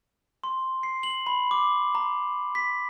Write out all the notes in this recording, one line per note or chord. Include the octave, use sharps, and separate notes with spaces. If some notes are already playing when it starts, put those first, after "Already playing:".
C6
C7
F#7
B5
D6
A#5
B6